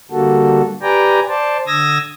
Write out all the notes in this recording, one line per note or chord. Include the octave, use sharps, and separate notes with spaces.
D3 G3 A#3 F#4 A4
G4 B4 D5 G5 G#5 A#5
C5 D5 A5
D3 D#6 E6 G#6 A#6